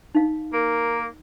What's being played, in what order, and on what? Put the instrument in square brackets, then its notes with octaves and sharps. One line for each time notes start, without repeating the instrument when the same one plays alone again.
[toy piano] D#4 F5
[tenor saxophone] A#3 [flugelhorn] A#4